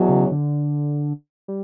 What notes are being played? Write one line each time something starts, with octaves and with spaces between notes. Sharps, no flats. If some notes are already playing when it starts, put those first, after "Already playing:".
Already playing: E2 B2 F#3
C#3
D3
G3